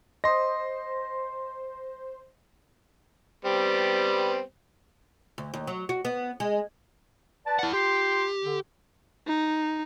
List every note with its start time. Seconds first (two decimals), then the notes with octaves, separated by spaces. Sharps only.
0.24 C5 D#5 C6 A#6
3.45 G3 B3 C4
5.38 D2
5.54 D#2
5.67 F#3
5.89 F#4
6.05 B3
6.40 G#3
7.46 B4 D5 A5
7.59 E4 F#5
7.73 F4 G4 G5 C6
8.44 D3
9.27 D#4